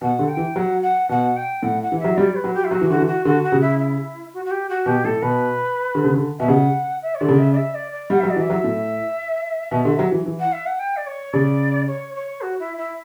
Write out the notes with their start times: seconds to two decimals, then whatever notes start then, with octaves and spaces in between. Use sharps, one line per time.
0.01 B2 F#5
0.19 D3
0.28 G5
0.37 E3
0.55 F#3 F#5
0.82 F#5
1.09 B2 F#5
1.36 G5
1.63 A2 F#5
1.82 F#5
1.92 E3
1.99 E5
2.04 F#3
2.16 G3 D5
2.35 B4
2.44 F#3
2.54 G4
2.64 E4
2.71 F#3 F#4
2.81 E3
2.89 D3 F#4
3.00 E3
3.06 F#4
3.25 D3 F#4
3.43 F#4
3.52 C#3
3.61 E4
3.78 E4
4.33 F#4
4.45 F#4
4.50 G4
4.69 F#4
4.86 B2 G4
5.04 A2 A4
5.22 B2 B4
5.95 D3
6.04 C#3
6.14 D3
6.39 B2 E5
6.48 C#3 F#5
7.02 E5
7.14 C#5
7.20 D3 D5
7.29 C#3
7.39 E5
7.52 D5
7.57 E5
7.74 D5
7.91 D5
8.10 G3 F#5
8.20 F#3 E5
8.30 D5
8.36 E3 E5
8.50 F#3
8.64 A2
9.71 B2
9.85 D3
9.99 F#3
10.12 E3
10.26 E3
10.39 F#5
10.52 E5
10.66 F#5
10.79 G5
10.96 D5
11.06 C#5
11.33 C#3 D5
11.87 C#5
12.15 C#5
12.41 F#4
12.59 E4
12.77 E4